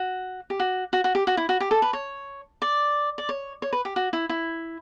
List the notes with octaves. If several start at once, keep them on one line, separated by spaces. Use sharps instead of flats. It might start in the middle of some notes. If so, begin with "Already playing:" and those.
Already playing: F#4
G4
F#4
F#4
F#4
G4
F#4
E4
F#4
G4
A4
B4
C#5
D5
D5
C#5
C#5
B4
G4
F#4
E4
E4